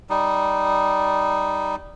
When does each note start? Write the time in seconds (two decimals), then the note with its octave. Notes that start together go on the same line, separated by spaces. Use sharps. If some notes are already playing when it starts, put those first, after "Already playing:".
0.10 G3 D#4